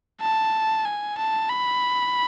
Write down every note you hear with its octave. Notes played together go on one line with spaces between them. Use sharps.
A5
G#5
A5
B5